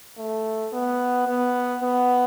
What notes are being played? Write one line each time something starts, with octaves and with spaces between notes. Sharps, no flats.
A3
B3
B3
B3